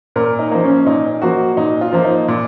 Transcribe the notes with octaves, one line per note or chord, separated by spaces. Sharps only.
A#2 A#4
D#4
F3 A#3
C#4
A#2 D#4
F3 A#3 F#4
A#2 D#4
F4
F3 A#3
D#4
A#2